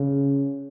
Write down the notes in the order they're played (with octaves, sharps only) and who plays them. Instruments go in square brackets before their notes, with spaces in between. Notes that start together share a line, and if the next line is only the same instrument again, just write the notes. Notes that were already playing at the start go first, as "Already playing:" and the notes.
Already playing: [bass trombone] C#3